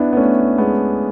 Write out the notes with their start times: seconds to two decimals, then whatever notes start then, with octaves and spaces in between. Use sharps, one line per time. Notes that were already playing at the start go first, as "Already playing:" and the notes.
Already playing: B3 D4 E4
0.13 B3
0.17 A3 C#4
0.58 G#3 B3